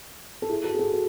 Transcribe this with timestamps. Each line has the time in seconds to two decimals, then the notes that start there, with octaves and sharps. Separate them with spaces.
0.42 A4
0.49 E4 G#4
0.64 F#4 A4
0.75 G#4
0.79 F#4 A4
0.93 F#4 A4